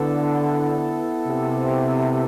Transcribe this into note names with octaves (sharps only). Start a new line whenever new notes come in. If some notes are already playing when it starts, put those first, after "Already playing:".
Already playing: D3 B3 E4 A4
C3